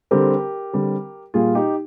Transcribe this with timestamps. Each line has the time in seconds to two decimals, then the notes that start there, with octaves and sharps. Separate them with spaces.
0.11 D3 G3 C4 G4 A#4
0.73 D3 G3 C4
1.34 A#2 G3 A#3 F4 G#4
1.55 D#4 G4